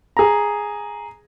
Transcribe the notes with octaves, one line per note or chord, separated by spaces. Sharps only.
G#4 A#5